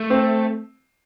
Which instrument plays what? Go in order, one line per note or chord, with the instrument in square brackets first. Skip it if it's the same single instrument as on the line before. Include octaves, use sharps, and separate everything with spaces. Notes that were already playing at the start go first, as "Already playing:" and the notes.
Already playing: [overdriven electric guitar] A3
[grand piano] C4